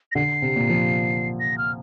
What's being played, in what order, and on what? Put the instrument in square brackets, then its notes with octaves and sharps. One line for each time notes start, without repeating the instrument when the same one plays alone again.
[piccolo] A#6
[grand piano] D3 [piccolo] C7
[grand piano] C3
A#2
F3
[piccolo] A#6
F6